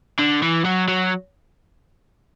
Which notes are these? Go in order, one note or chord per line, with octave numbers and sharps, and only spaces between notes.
D3
E3
F#3
F#3